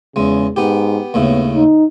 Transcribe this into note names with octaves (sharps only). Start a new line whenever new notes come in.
E2 C#3 G#3
G#2 B3 G4
D#2 A2 C#3 B3
D#4